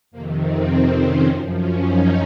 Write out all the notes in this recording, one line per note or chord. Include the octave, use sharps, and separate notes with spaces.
F2 C3 D#3 A#3
C4
C#4
F#2 F3
C#4
D#4